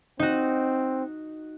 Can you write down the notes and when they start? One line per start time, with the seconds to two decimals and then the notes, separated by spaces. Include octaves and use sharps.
0.19 C4 D#4 F#4